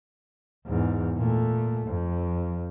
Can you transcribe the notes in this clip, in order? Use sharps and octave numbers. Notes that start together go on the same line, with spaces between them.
E2 G#2
A#2 A3
F2